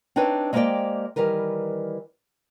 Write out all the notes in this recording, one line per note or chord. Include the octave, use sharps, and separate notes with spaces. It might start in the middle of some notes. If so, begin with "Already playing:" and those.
C4 D4 D#4 B4 C#5
G#3 A#3 G4 C5 D5 G5
D#3 E3 G3 A#4 B4